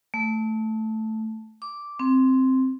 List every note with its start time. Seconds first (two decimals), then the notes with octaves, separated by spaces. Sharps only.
0.14 A3
1.62 D6
1.99 C4